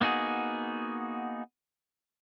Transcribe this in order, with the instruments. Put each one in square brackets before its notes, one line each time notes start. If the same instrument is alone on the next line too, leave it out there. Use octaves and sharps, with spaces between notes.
[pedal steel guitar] A#3 B3 D#4 F#4 G#4